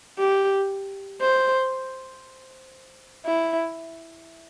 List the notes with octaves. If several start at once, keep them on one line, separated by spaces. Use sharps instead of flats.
G4
C5
E4